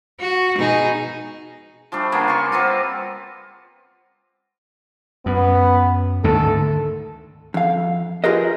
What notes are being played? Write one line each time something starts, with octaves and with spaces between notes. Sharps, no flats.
F#4
B2 D#4 G#4
F3 G3 A3 D4
C#3 G3 A#3 B3
C6 C#6
G3 B3 C4 F4
F#2 B3
D2 G#2 D#3 A4
F2 F5
F4 G4 G#4 A#4 B4 D#5